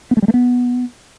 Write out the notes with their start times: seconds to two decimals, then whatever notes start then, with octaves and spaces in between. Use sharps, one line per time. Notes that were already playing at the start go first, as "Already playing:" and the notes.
0.11 B3
0.17 A3
0.22 G3
0.28 A3
0.34 B3